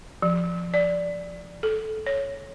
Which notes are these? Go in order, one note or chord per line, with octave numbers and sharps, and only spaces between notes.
F3
D5
A4
C#5